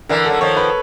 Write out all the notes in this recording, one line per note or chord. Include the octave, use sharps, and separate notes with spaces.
D3 E3 A#4
F#3 A4
D#3 F3 C#5
B4